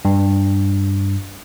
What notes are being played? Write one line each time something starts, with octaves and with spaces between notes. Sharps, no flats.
G2